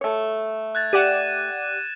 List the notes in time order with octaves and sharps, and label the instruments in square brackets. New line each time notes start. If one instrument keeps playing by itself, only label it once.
[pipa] A3 C#5
[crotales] F#6 G#6 A6
[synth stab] G4 D5 F#5 [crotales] D#7 E7